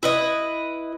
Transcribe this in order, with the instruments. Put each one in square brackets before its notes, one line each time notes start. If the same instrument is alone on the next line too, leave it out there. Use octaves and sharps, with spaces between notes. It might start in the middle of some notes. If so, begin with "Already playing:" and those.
[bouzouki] E4 B4 D#5